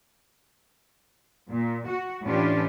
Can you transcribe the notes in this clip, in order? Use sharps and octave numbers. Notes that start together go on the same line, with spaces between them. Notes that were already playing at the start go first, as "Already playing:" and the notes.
A#2
F#4
A2 E3 C#4 D4 F4 G4